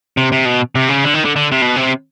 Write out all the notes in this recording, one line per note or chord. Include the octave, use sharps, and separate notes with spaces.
C3
C3
B2
C3
C#3
D3
D#3
D3
D3
C3
B2
C3